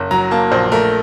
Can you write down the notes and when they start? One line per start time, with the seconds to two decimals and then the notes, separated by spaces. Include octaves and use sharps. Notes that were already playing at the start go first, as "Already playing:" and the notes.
Already playing: F#1
0.11 F#3 A#5
0.31 A#3 A5
0.52 A#1 C5
0.72 A3 A#4